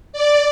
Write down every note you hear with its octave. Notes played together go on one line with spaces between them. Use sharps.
D5